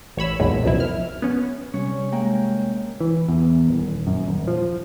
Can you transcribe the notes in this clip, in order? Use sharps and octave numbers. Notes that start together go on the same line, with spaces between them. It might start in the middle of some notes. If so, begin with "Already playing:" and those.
A1 C#5 B5 E6
B1 E2 A#2 D#3 F#3 G#3
C2 F#2 B2 F3 E4
B1 F6
B3 C#4
C3 G3 C#4 C#5
G#3 A#3 G5
E3
E2
D#1
F#2
D#1
F3